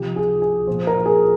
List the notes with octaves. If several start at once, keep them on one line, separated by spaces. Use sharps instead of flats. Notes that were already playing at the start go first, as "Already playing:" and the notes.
Already playing: C3 F3 G4
G#4
G#4
A#2 F3 C5
A#4
G#4